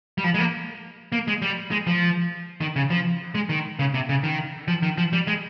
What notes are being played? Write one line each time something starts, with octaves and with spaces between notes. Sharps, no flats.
G3
F3
G#3
A#3
A#3
G#3
G3
G#3
F3
D#3
C#3
F3
G#3
D#3
C#3
C3
C#3
D#3
F3
D#3
F3
G3
G#3